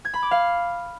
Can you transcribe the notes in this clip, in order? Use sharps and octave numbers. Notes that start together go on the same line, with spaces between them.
G#6
B5
D6
F5